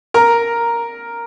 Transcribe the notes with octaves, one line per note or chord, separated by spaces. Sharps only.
A#4 A#5